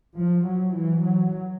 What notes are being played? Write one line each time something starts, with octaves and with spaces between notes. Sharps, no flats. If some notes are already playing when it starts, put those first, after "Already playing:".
F3
F#3
E3
F#3